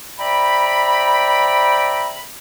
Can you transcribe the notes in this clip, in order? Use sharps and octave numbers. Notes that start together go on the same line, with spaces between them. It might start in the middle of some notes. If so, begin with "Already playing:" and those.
C5 D5 E5 G5 A#5 B5